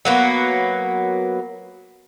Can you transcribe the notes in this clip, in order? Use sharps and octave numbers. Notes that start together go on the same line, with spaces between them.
F#3 A#3 B3